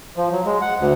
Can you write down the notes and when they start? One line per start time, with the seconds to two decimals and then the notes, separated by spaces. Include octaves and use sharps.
0.16 F3
0.32 F#3
0.45 G#3
0.61 F#5
0.79 D2